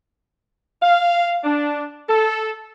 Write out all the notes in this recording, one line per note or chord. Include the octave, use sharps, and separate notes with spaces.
F5
D4
A4